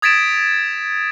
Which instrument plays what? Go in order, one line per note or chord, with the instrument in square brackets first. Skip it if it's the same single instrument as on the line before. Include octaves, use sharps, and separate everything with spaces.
[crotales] D#6 G#6 A6 B6 D7 E7